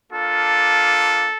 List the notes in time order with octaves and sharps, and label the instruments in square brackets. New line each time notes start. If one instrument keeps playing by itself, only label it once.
[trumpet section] A#3 D4 F4 A4